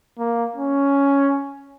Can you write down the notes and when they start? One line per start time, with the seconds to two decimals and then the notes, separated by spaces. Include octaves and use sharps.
0.19 A#3
0.56 C#4